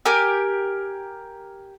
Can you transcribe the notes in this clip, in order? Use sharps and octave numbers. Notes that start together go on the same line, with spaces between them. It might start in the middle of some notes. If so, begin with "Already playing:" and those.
G4 A#4 G#5